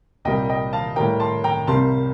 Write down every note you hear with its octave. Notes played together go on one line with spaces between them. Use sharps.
C2 A#2 G3 A#3 D#5 G5
D#5 G5
F5 A5
A2 G3 A#3 G5 A#5
A5 C6
G5 A#5
C2 C3 G3 A#3 A5 C6